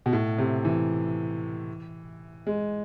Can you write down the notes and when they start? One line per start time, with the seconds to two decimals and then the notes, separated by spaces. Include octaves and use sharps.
0.06 B2
0.13 A2
0.38 C3
0.65 E3
2.47 G#3